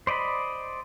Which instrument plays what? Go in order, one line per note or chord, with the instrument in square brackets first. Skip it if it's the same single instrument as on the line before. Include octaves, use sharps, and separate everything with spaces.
[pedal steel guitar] C5 D5 D#5 B5